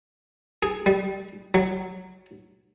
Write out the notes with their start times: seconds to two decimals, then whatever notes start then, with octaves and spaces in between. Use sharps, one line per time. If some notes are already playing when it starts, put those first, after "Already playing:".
0.63 G#4
0.86 G3
1.54 F#3